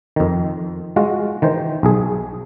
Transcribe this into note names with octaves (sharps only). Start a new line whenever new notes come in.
F2 D#3
G#3 F4 F#4
D#3 E3 C5
B1 G#4